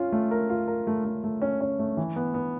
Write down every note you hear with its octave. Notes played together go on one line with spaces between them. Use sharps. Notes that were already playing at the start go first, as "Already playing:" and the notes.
Already playing: C#4 F4
A3
A#4
F4
A#4
A3
A3
A3
C#4
C#4
A3
E3
B3
B3